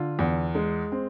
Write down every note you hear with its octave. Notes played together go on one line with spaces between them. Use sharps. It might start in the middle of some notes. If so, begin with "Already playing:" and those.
Already playing: D3 F4
E2
G#3
C4